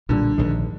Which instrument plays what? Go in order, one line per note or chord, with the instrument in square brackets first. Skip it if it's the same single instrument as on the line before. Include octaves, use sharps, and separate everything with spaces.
[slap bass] B1 A#2 G3 [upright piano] D3
[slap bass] A#1 G#2 D#3